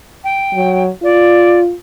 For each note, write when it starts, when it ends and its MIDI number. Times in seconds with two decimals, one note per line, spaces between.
0.23 0.82 79
0.54 0.90 54
1.03 1.74 65
1.03 1.60 74